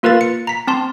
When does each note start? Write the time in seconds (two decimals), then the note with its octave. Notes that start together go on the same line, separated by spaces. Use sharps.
0.03 A#3 F4 A#4 B4 F5 A6
0.21 C#7
0.47 A#5 B6
0.67 C4 A5 C6